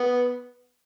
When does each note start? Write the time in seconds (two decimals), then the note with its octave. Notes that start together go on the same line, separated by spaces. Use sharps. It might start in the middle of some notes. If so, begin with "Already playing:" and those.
Already playing: B3